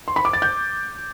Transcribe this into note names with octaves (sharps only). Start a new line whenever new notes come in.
C6
B5
D6
A6
G6